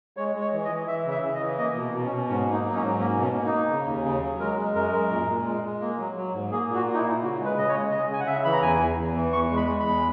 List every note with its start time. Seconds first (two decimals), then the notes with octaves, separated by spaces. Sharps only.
0.17 G#3 C#5
0.35 G#3
0.41 C#5
0.53 E3
0.65 D#5
0.70 E3
0.87 E3 E5
1.06 C#3
1.11 E5
1.23 C#3
1.35 D#5
1.40 E3
1.58 A#3 D#5
1.76 B2
1.93 B2
2.05 C#4
2.11 B2
2.28 G#2 C#4
2.46 A#3
2.53 D#4
2.64 F#3 D#4
2.76 C#4
2.81 G#2
2.99 A#3 C#4
3.17 B2
3.22 C#4
3.34 A#3
3.46 D#4
3.52 A#3
3.70 C#3
3.87 D#2
4.04 C#3
4.22 F#3
4.40 G#3 A#4
4.57 G#3
4.75 F#2 A#4
4.92 G#3
5.11 A#2
5.28 A#2
5.46 G#3
5.63 G#3
5.81 A#3
5.99 F#3
6.16 F#3
6.34 G#2
6.51 A#3 G#4
6.68 A#2
6.75 F#4
6.86 A#3
6.94 D#4
6.98 E4
7.04 A#2
7.22 C#3 F#4
7.39 G#3
7.45 B4
7.57 C#3 D#5
7.69 C#5
7.74 G#3
7.92 C#3 D#5
8.10 C#3 G#5
8.20 F#5
8.27 C#3 E5
8.44 E3 B5
8.53 A#5
8.62 E2 G#5
8.80 E2
8.98 E2
9.15 E3
9.33 E2 C#6
9.51 G#3
9.57 B5
9.68 G#3
9.80 B5
9.86 E2